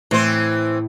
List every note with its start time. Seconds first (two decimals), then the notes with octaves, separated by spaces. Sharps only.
0.11 A2 E3 C4 C5